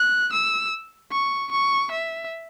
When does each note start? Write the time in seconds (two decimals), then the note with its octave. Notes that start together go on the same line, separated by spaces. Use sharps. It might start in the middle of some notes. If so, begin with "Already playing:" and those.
Already playing: F#6
0.32 E6
1.11 C#6
1.51 C#6
1.91 E5